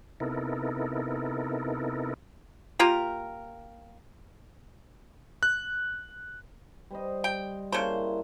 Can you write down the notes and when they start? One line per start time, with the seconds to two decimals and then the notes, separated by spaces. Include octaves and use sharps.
0.20 C3 B3 D#4 E4 A4 A#4
2.79 A#3 F4 G4 A#4
5.43 F#6
6.91 G3 C5 D#5
7.24 G5
7.72 C#3 A#3 D4 E4 C5